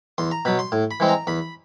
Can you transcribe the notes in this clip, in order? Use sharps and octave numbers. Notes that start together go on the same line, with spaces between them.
E2 C6
A#5
B2 F#3 B5
C6
A2
B5
E3 G#3 C4
A#5
E2 B5